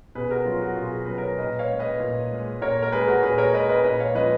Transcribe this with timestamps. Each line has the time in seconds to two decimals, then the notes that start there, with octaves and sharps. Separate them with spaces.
0.15 B2 G#4 B4
0.31 F#4 A#4
0.46 F#3 F4
0.62 F#4
0.76 B2 F4 G#4
1.06 F#3 B4
1.18 A#4 C#5
1.38 A#2 B4 D#5
1.59 C#5 F5
1.69 G#3
1.79 B4 D#5
2.00 A#2
2.31 G#3
2.61 A#2 A#4 C#5
2.82 A#4
2.92 G#3 G#4 B4
3.07 F#4 A#4
3.22 A#2 G#4 B4
3.38 A#4 C#5
3.53 G#3 B4 D#5
3.69 B4 D#5
3.84 A#2 B4 D#5
4.00 C#5 F5
4.15 F3 G#3 B4 D#5